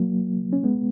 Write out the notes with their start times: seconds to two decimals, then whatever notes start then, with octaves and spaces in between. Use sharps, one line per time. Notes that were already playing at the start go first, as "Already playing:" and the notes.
Already playing: F#3 A#3
0.53 C#4
0.63 G#3 B3